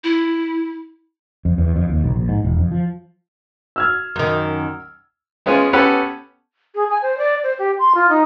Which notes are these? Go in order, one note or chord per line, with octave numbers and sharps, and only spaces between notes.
E4
F2
E2
F2
D#2
B1
A#1
G#2
E1
F2
F3
E6 F6 G#6
F#2 D#3
G#3 B3 C#4 F4 G#4
B3 C#4 G4 A4 F#5 B5
G#4
G#5
C5
D5
C5
G4
C6
F4
D#4